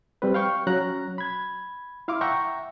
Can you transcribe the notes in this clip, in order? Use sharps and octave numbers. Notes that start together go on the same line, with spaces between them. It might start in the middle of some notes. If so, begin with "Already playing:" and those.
G3 C4 B4
F5 G5 C#6
F#3 C#4 A#5 F#6
B5 G#6
E4 F5 C6 D6
E5 F#5 G5 A#5 C#6